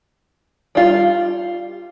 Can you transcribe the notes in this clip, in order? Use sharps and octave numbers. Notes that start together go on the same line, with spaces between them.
G3 F4